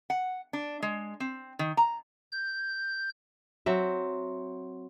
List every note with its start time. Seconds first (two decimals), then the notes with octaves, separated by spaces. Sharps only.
0.10 F#5
0.53 D4
0.82 G#3
1.20 C4
1.59 D#3
1.77 A#5
2.31 G6
3.66 F#3 C4 E5